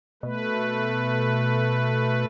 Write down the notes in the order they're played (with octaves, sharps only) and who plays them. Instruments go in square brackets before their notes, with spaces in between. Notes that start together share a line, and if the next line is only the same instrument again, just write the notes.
[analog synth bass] B2 [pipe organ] A3 B4